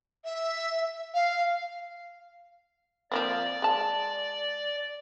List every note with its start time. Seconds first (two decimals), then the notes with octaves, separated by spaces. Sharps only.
0.24 E5
1.14 F5
3.12 F3 A#3 C4 D5
3.62 G#3 A5